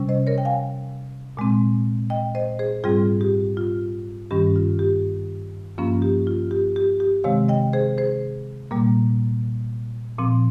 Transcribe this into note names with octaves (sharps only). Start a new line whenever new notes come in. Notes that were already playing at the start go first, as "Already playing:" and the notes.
Already playing: C3 G3 C#4
C5 D#5
A#4 C#5
G5
F5 G#5
A#2 G#3 C4
D#5 G5
C5 D#5
G#4 C5
G#2 G3 C4 F4 G#4
G4
F4
G2 D#3 G3 C#4 G4
F4
G4
G2 F3 A#3 C#4 F4
G4
F4
G4
G4
G4
C3 D#3 G#3 C4 C#5 F5
D#5 G5
G#4 C5
G#4 C5
A#2 G3 A#3
A#2 F3 C4